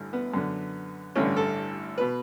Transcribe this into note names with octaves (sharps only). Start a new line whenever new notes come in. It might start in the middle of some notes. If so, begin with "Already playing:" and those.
Already playing: A1 G2 D3
B3
F#2 D3
A1 G2 D3 C#4
A4
B2 B4